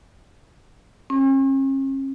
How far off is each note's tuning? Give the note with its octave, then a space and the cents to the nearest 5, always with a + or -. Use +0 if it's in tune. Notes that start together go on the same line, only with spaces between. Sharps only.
C#4 -40